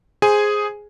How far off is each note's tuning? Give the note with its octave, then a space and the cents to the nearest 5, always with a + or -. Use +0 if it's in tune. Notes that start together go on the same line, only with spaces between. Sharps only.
G#4 +0 C5 +0 G#5 +0